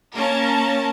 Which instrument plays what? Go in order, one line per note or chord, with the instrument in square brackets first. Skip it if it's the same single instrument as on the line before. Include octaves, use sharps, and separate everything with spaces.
[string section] A#3 C#4 A#4 A5 A#5